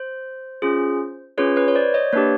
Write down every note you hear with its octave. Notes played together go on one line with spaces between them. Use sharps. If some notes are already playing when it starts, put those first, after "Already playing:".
Already playing: C5
C#4 F4 G#4
C#4 F4 G#4 B4 C#5
B4 C#5
C#5
C5 D5
C#5 D#5
A#3 D4 G4 B4 C#5